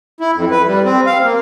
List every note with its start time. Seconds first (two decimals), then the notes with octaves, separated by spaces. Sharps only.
0.20 E4
0.36 F2
0.51 B4
0.67 G3
0.84 C4
1.06 F5
1.24 A#3